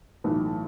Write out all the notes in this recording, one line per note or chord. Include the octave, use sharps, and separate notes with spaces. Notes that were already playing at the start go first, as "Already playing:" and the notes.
B1 A2 E3